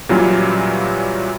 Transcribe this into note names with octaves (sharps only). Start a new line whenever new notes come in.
A#2 E3 F#3 G3 C#4 F4